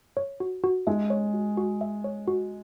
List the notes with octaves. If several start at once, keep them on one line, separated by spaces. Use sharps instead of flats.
C#5
F#4
F#4
G#3 E5
C#5
F#4
F#4
E5
C#5
F#4